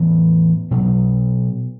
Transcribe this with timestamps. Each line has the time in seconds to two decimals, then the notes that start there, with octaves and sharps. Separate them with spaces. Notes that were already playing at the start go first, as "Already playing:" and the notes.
Already playing: A2 E3 B3
0.71 B2 F#3 B3